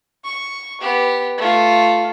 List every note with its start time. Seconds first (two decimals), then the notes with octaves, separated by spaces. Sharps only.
0.24 C#6
0.81 B3 G4
1.38 A3 F4